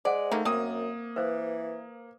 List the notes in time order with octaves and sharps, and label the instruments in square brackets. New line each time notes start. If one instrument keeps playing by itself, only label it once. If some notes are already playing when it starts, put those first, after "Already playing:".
[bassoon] G#3 [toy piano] C5 F#5 [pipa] D5
[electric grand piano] A3 [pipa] A#3 D#4 [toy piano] E5
[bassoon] F#2 [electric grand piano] A#3 D#6 [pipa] C4
[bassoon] E3 [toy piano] B4 C5 F5